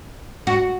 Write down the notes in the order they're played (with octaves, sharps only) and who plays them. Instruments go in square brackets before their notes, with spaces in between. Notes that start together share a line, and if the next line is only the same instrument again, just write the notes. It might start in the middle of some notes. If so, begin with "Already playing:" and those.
[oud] F#4